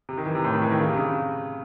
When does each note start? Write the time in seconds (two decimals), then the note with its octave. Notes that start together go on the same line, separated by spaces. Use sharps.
0.09 C3
0.18 D#3
0.26 E3
0.35 C3
0.44 A2
0.53 D#3
0.62 E3
0.71 D#3
0.80 C#3
0.89 C3
0.97 C#3